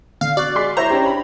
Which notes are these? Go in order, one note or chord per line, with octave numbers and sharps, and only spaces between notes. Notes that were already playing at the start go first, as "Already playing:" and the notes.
D3 F5
F#4 D5 C#6 F#6
G#3 C6 B6
E4 C5 C#5 A#5
C#4 D4 G4
B5